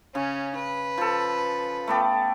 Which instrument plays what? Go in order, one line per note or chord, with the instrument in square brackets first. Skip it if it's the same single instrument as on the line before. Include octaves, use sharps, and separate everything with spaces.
[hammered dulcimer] C#3 [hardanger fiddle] C#4
[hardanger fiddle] B4
[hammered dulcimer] F3 A4
[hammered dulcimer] A3 B3 D5 [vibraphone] G5 A5